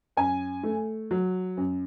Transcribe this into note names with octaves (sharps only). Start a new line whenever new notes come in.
F#2 G#5
A3
F#3
F#2